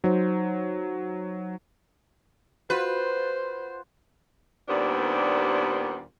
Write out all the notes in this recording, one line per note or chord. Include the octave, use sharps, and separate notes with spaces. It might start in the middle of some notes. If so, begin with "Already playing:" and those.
F#3 D#4 C5
F4 F#4 B4 C5
D#2 A#2 G3 B3 C4 D4